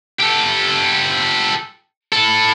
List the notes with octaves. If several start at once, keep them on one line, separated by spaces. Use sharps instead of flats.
G4 A4
E4 A4